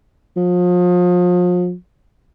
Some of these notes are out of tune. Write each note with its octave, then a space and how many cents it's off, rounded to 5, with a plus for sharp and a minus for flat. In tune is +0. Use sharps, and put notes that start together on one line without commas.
F3 +35